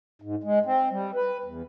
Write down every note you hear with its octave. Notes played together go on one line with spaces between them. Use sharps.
G#2
G#3
C4
G3
B4
E2